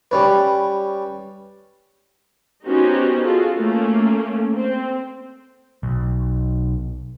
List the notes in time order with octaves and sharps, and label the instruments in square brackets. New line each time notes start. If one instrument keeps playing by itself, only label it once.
[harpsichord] G3 C#4 B4
[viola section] B3 C#4 D#4 F#4 G4 C5
F4 F#4 G#4 A4
A3 A#3 C#4
C4
[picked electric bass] B1